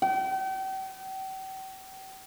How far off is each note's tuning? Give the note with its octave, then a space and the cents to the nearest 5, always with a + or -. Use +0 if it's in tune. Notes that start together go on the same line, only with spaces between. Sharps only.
G5 -40